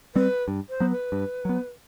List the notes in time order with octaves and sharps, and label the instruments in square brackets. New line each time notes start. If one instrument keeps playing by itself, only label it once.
[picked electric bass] G3 C4 [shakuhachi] B4
[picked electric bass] G2
[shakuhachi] C5
[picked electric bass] F#3 B3
[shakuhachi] B4
[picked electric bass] G2
F#3 B3